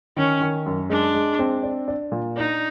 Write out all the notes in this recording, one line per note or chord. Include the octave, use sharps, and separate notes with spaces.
D#3 C#4
D#3
F#2
G#3 D4
G#3
C4
D4
D4
A#2
D4 D#4